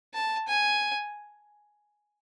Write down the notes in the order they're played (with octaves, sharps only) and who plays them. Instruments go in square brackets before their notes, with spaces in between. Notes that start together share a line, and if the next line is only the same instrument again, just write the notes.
[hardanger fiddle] A5
G#5